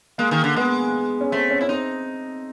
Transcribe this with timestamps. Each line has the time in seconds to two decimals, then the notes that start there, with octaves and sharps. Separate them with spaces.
0.18 G#3 A#3
0.31 D#3
0.44 D3
0.56 G#3 B3
1.21 C#4
1.32 A3 C4
1.50 C#4
1.61 C#4 E4
1.69 C4 D#4